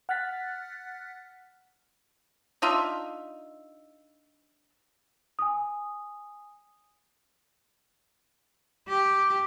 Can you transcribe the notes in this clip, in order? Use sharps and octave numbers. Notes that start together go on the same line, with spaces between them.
F#5 F6 F#6 A6 B6
D4 D#4 F4 E5
G#5 D#6
G4 D6